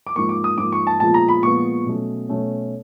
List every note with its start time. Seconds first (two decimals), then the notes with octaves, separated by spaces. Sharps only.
0.07 D6
0.16 G#2 F3 A#3 C#6
0.29 D6
0.44 D#6
0.58 G#2 F3 A#3 D6
0.72 C#6
0.87 A5
1.00 A#2 F3 G#3 B3 A5
1.14 A#5
1.28 B5
1.43 A#2 F3 G#3 B3 C#6
1.86 B2 F#3 A3 C#4
2.29 B2 F#3 A3 C#4